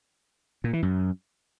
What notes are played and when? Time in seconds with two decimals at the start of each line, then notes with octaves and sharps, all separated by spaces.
0.64 A#2
0.73 E3
0.83 F#2